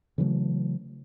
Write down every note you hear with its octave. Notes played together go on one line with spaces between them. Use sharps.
C#3 E3 F#3 A3